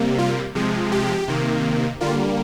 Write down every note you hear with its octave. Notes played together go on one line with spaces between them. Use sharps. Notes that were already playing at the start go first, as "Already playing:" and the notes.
Already playing: C3 G3 A#3
F4
C3 F3 G#3
G4
C3 D#3 A#3
D3 G3 A#3 F4